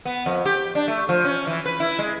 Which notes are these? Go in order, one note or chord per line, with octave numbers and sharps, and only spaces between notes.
B3
F2
G4
D4
A3
F3
C#4
E3
B4
E4
G#3